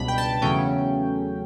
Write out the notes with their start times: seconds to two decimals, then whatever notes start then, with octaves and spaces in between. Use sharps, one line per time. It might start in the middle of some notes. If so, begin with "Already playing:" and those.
Already playing: C#2 B2 G3 D4 B5
0.08 G5
0.18 A5
0.42 E2 C#3 F#3 A3 C#4 G5